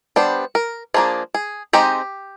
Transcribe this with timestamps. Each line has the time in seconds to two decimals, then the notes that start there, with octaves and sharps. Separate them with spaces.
0.16 G3 B3 D4 C5
0.55 A#4
0.94 F3 A#3 D4 G#4
1.34 G#4
1.73 G#3 C4 D#4 G4